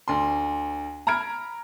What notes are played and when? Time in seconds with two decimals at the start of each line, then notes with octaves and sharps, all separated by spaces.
0.08 D2 C6
1.07 A#5 B5 F6 G#6 D7